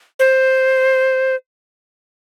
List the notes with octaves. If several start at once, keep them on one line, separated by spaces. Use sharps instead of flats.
C5